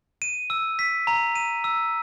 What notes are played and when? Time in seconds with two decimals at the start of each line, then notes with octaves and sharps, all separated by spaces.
0.22 D#7
0.50 E6
0.79 B6
1.07 A#5
1.35 D#7
1.64 E6